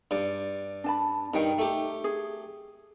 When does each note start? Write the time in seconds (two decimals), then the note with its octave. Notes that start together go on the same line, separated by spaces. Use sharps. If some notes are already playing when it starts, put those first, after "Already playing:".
0.11 G2 D5
0.84 D4 A5 B5
1.34 G2 D#3 D#4 G5
1.59 A3 G4
2.04 G#4